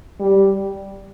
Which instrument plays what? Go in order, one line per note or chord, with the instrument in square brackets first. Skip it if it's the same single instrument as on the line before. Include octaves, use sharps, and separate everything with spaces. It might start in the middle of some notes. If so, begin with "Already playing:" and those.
[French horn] G3